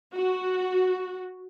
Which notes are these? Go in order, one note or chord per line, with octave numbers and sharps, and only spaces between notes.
F#4